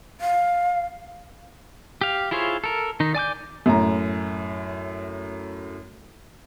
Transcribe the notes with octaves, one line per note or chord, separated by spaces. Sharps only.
F5
G4 F5
E4 F4 G#4 C5 C#5
A4 A#4
D#3 D#4
D5 G#5 D6 G6
F#2 A2 A#5